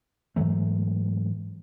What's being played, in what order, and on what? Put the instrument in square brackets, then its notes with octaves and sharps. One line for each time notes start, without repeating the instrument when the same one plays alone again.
[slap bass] G#2 E3 F#3 A3